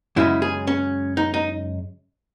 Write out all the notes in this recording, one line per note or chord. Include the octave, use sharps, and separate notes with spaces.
F#2 C#3 G#3 C#4 E4
G#4
C#4
D#4
D#4